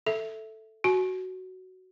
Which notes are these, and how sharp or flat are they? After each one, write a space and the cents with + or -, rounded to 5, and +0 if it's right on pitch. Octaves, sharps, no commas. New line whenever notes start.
A4 +0 E5 +0
F#4 +10 G#5 +40